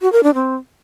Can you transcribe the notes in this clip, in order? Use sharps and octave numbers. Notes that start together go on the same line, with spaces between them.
F#4
A#4
D4
C4